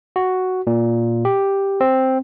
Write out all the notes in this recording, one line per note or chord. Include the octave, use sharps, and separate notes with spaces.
F#4
A#2
G4
C4